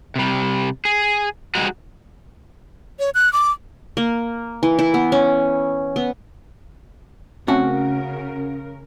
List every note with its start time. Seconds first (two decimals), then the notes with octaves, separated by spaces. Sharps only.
0.16 C3 G3
0.85 G#4
1.55 G3 G#3 D#4 F#4
2.99 C#5
3.15 F#6
3.33 D6
3.97 A#3
4.63 E3
4.79 E4
4.94 B3
5.12 C#4
5.96 B3
7.48 C#3 A3 C4 C#4 F#4 A#4